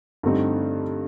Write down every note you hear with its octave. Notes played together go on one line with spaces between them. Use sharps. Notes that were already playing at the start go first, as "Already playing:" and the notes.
G2 D3 A3 C4 D#4